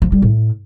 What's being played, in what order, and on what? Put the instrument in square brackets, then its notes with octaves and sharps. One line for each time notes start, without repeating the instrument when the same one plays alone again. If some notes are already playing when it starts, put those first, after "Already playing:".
[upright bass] F3
G3
A2